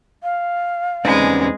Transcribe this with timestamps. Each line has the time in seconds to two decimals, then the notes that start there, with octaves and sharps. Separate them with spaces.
0.23 F5
1.05 E2 G#3 C4 C#4 D#4 B4 D5